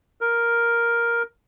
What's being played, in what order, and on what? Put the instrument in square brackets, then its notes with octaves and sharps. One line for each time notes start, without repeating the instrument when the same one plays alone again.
[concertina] A#4